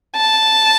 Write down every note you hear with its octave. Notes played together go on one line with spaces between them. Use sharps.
A5